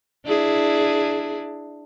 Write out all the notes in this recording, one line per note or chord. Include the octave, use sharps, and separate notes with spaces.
D4 E4 G#4